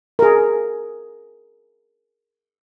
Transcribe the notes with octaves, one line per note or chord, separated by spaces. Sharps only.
G#4 A#4